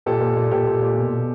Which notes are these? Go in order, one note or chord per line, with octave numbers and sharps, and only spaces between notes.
A#2 G4 A4
A#2
A#2
A#2 G4 A4
A#2
A#2
B2
B2